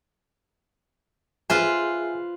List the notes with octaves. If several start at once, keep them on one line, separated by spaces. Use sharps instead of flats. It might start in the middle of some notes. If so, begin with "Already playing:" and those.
F4 G#4 B4 C5 E5 G#5